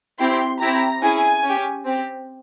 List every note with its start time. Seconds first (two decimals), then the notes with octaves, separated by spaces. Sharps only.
0.20 C4 E4 G4 C6
0.60 C4 E4 G4 A#5
1.02 C#4 E4 G#4 G#5
1.43 C#4 G4
1.85 C4 G4